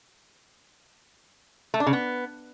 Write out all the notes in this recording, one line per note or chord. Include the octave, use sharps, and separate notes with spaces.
A3
D4
C#3
B3